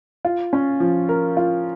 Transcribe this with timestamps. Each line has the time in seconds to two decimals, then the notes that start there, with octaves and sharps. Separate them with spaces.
0.25 F4
0.53 C#4
0.80 F3
1.09 A#4
1.37 F4